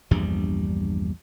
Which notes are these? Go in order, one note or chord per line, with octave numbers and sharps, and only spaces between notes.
A#1 E2 G2 G3